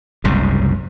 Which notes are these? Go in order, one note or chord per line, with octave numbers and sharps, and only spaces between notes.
F#1 C2 G#2 C#3